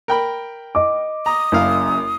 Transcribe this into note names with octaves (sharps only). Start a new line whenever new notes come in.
A#4 G5 B5
D#5 D6
A#5 D#6
F#1 F#2 E4 F5